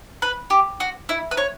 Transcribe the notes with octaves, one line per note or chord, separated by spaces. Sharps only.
B4
G4
F#4
E4
B4
C#5